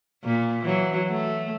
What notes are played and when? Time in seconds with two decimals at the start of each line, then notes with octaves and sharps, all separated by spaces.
0.24 A#2
0.65 E3 F#3
1.10 A3